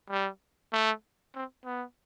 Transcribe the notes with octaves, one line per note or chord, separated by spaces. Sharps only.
G3
A3
C4
B3